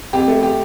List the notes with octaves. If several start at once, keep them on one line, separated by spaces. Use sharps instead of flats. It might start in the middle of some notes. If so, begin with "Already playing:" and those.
F2 G4
A3
G4